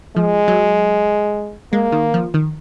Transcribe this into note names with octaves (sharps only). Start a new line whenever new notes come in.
F3 G#3
F#3
G#3 A#3
D#3
F3
D#3